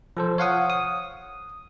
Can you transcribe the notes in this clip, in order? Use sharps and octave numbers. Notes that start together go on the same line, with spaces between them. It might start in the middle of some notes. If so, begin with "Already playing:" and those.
F3 A4 C5
C#5 F5 F#5 D#6
D#6